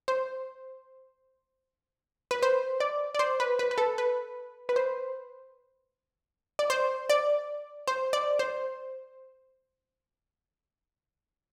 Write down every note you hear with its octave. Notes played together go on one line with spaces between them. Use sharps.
C5
B4
C5
D5
D5
C5
B4
B4
B4
A4
B4
B4
C5
D5
C5
D5
C5
D5
C5